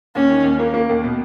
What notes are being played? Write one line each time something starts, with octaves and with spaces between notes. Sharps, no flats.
D#2 C#4
D#3
D#2
A#3
A#3
D#2
B2